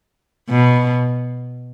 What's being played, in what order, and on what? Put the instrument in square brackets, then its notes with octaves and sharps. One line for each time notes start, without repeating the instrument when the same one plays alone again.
[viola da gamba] B2